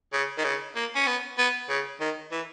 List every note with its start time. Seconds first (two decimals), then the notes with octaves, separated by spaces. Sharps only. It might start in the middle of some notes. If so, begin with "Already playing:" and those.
0.13 C#3
0.38 D#3
0.44 C#3
0.75 A#3
0.95 C#4
1.07 B3
1.38 B3
1.69 C#3
2.00 D#3
2.31 E3